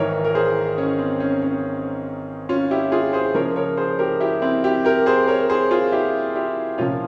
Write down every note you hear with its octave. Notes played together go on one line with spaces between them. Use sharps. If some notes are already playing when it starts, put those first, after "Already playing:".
Already playing: G#1 G#2 E3 A#4 C#5
A#4
G#4 C5
C#4
C4
C#4
C#4
C#4 F4
E4 G4
F4 G#4
G#4 C5
C#2 C#3 F3 A#4 C#5
A#4 C#5
G#4 C5
G4 A#4
E4 G4
C4 E4
E4 G4
G4 A#4
G#4 C5
A#4 C#5
G#4 C5
F4 G#4
E4 G4
E4 G4
C2 A#2 F3 C#4 F4